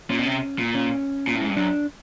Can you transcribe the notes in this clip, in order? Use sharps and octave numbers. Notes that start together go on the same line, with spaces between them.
A#2 C#4
B2
C3
A#2
C#4
A#2
A2
G#2
G2
F#2 D4